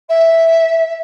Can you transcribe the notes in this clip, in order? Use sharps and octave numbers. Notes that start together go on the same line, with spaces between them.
E5